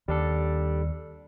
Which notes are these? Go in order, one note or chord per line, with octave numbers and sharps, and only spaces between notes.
D#2 G3 D4 A4